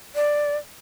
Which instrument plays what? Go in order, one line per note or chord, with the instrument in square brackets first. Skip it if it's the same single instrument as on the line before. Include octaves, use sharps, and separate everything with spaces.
[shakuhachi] D5